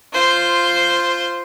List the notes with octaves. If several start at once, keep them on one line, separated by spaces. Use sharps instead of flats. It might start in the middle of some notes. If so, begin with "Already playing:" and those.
F4 C5